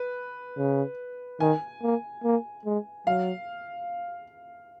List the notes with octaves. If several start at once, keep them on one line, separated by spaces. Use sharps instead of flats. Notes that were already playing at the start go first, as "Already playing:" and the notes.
Already playing: B4
C#3
D#3 G#5
A#3
A#3
G#3
F#3 F5